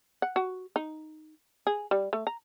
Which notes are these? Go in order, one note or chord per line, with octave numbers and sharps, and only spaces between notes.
F#5
F#4
D#4
G#4
G3
A3
A#5